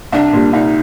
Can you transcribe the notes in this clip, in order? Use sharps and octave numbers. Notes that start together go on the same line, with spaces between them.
C2 D4
A#2 G3
C2 D#4